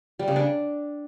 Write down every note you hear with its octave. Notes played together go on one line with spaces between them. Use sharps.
G3
C#3
D4